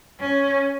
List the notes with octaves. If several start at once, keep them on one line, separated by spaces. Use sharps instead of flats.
C#4